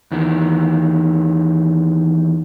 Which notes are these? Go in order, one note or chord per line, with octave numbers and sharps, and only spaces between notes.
E2 D#3